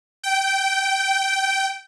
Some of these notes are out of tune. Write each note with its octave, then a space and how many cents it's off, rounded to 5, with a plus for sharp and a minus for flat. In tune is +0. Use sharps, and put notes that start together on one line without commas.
G5 -15